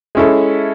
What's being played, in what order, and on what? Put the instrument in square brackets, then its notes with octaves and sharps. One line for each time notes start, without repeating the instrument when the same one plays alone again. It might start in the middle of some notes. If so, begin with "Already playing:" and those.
[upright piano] G#3 C#4 E4 A4